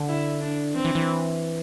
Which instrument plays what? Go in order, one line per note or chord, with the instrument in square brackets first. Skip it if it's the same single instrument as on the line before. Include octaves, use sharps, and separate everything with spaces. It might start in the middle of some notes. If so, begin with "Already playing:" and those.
Already playing: [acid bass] D3
[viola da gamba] E4
D4
[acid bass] E3 [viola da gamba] C4
[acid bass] E3
E3